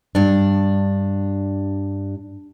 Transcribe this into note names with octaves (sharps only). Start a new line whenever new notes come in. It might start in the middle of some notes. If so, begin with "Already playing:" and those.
G2 D4